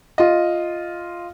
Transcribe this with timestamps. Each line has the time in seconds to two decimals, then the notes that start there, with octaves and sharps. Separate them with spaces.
0.18 F4 D#5